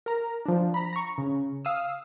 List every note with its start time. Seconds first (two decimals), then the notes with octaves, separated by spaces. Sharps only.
0.06 A#4 A#5
0.46 F3 D4
0.74 A#5 B5
0.93 A#5 C#6
1.18 C#3
1.65 F5 D#6 E6